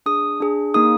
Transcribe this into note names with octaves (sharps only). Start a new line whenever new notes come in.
D4 G#4 D#6
D4 G#4
A#3 D#4 G#4 D#6